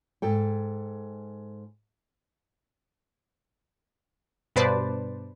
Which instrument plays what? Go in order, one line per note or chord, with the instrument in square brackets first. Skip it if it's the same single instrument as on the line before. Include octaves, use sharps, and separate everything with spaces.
[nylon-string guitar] G#2 A4 G5
[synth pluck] G2 B2 B4 C5 D5 A5